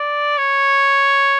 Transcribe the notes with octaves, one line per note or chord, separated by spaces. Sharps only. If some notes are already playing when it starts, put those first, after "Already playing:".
Already playing: D5
C#5